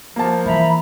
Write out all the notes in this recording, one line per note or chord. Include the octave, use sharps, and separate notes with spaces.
F3 A#3 A5
E3 E5 A#5 B5